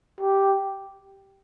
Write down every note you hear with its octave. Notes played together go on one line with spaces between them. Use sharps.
G4